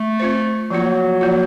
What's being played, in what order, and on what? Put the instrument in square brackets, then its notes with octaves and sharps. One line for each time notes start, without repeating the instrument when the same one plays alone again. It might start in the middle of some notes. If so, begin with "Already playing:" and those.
Already playing: [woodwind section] A3
[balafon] C4 F4 C5
[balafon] F3 A#3 F4 [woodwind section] F#3
[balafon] F3 A#3 F4